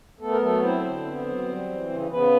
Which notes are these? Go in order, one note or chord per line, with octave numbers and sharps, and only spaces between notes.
A3 B3 A4
A#4
F#3 A3 A4
C4 E4 C5
D3
B3
F#3
G3
E3
C#3
C#3 B3 B4